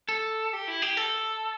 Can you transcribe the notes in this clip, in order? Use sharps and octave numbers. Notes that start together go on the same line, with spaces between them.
A4
G4
E4
G4
A4